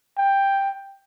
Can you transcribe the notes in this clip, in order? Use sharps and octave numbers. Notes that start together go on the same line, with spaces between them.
G5